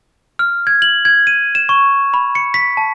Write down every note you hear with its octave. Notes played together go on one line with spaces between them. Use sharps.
F6
G#6
F#7
G#6
D#7
E7
C#6
B5
C#7
B6
A5